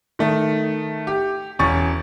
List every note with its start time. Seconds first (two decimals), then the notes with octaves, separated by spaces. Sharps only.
0.19 D#3 A3
1.07 G4
1.59 E1 C#4 C#6 A6